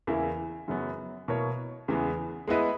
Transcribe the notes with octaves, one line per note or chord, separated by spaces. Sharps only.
E2 C#3 E3 A#3 E4
F#2 C#3 F#3 B3
B2 A#3 E4 A#4 C#5
E2 C#3 E3 G#3 B3
G#3 B3 E4 B4 D#5